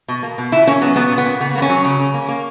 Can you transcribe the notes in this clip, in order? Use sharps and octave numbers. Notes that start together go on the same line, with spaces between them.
B2
A#3
B2
A#2 E4
A#3 C#4
F#3 B3
A#2 B3
A#2
B3
A#3
C#3 B3
A#3 B3
C#4
F#3
C#3
C#3
A#3
A#3